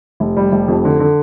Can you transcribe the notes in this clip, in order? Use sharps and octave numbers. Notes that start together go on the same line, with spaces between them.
F1
G3
F1
F2
D3
D3